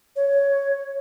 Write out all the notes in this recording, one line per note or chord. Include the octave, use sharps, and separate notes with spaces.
C#5